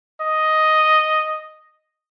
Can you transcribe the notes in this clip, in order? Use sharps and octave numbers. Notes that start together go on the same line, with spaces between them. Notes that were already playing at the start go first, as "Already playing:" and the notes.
D#5